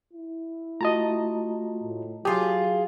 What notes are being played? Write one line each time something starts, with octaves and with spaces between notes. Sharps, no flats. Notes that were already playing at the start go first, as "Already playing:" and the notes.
E4
A3 F4 F#4 D#5 A5 A#5
A2
F#3 F4 G4 G#4 A5